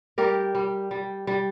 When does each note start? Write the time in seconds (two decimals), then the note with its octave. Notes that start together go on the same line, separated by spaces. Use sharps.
0.18 G3 G4 A#4
0.55 G3
0.91 G3
1.27 G3